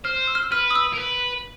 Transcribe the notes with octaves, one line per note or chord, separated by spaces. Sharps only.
C5 F6
E6
F6
E6
B4 F6
D#6
E6
A#4
B4